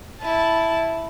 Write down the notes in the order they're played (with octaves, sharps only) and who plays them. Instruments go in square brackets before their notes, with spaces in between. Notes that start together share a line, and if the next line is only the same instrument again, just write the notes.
[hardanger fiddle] E4 A5